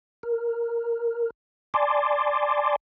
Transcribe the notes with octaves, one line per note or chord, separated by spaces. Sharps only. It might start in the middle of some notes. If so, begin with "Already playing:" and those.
A#4
D5 G#5 A5 C6 D6